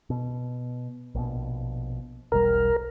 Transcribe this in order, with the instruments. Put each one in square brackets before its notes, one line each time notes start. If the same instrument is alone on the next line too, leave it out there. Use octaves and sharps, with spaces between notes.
[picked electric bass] B2
A#1 B2
[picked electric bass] E1 B1 G3 [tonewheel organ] A#4